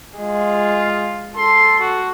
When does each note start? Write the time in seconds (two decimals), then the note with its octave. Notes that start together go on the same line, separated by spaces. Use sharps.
0.19 G#3 F4
1.36 A4 C6
1.80 F#4